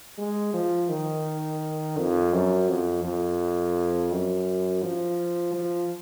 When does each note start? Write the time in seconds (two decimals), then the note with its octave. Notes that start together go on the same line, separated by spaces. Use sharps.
0.18 G#3
0.54 F3
0.89 D#3
1.97 F2
2.33 F#2
2.69 F2
3.04 F2
4.12 F#2
4.83 F3
5.54 F3